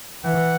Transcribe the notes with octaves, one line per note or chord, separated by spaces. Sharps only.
E3 F#5